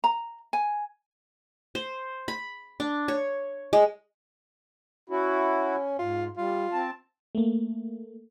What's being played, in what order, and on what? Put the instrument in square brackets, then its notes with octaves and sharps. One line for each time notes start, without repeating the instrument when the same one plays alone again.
[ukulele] A#5
G#5
[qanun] C5
B5
D4
C#5
G#3
[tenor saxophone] C#4 [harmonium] E4 F#4
[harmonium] G#2 [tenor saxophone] F4
[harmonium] G3 [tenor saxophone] F4
[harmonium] C4 A5
[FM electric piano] A3 A#3